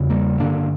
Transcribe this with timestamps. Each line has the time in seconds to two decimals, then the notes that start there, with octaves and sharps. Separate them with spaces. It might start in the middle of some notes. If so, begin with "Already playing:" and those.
Already playing: E2 C#3
0.10 G3 A#3
0.39 G2 D3 A#3 D4